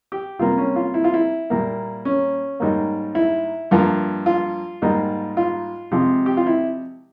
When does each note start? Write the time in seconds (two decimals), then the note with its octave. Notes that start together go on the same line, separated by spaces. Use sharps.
0.12 G4
0.39 C3 G3 A#3 F4
0.58 C#4
0.76 F4
0.94 E4
1.04 F4
1.14 E4
1.50 A#2 G3 A#3
2.05 C#4
2.60 G#2 G3 A#3
3.15 E4
3.71 G2 F3 A#3
4.26 F4
4.82 G#2 G3 A#3
5.37 F4
5.91 C3 F3 G#3
6.26 G4
6.37 F4
6.47 E4